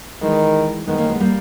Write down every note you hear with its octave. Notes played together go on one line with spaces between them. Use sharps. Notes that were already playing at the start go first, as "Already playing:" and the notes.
D#3 E3 G#3
D#3 G#3 B3
A#3 C#4
G#3 B3
G3 A#3